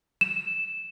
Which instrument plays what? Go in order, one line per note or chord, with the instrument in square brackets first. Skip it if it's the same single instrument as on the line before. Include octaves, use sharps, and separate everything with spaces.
[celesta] E7